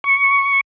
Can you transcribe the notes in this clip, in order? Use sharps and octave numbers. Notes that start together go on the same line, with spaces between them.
C#6